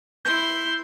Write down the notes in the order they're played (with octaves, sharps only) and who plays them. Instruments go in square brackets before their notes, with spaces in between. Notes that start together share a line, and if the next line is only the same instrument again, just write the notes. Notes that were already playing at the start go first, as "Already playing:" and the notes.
[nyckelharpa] E4 C6 [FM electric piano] G6